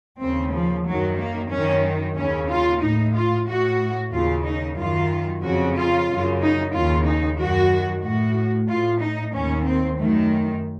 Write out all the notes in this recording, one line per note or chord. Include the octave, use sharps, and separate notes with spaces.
D#2 C#3 C4
F3
F#2 D#3 F#3
A#3
F#2 D#3 C#4
D#2 C#3 C#4
F4
A2 D#4
F4
A2 F#4
D#2 C#3 F4
D#4
F#2 D#3 F4
F2 C#3 F#4
F4
F#2 C#3
D#4
D#2 C#3 F4
D#4
F#2 D#3 F#4
A2 F#4
A2 F4
D#4
D#2 D#3 C#4
C4
F#2 D#3 A3